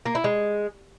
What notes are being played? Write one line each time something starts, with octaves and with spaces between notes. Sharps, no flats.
A#3
E4
G#3